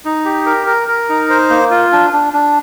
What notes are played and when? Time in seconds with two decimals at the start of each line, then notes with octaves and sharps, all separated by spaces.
0.05 D#4
0.25 G4
0.46 A#4
0.67 A#4
0.88 A#4
1.09 D#4
1.29 C5
1.50 A#3
1.71 F4
1.92 D4
2.13 D4
2.33 D4